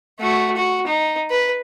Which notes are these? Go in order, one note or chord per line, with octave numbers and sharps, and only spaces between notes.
A3 F#4
F#4
D#4
B4